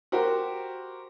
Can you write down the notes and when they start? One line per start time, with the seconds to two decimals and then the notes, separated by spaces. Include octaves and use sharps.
0.12 F#4 G4 A#4 C5